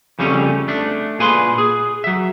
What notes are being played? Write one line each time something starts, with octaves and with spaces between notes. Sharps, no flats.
F2 C#3 G3 A3 B3 C#4
A3 D4
A#2 G#4 B4 C6
G#4
F#3 E5